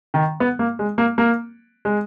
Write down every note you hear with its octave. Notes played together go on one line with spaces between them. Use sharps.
D#3
B3
A#3
G#3
A#3
A#3
G#3